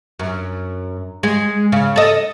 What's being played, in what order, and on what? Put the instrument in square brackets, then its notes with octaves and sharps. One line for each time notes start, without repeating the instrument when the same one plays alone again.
[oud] F#2
G#3
C#3
A4 D#5